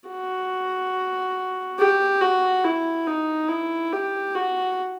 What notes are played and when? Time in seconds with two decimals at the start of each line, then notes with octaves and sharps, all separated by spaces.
0.09 F#4
1.79 G4
2.21 F#4
2.65 E4
3.07 D#4
3.49 E4
3.93 G4
4.35 F#4